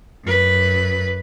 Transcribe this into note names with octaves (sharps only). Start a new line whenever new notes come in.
F#2 B4